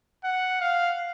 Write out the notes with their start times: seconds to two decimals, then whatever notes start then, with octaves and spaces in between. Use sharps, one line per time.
0.24 F#5
0.61 F5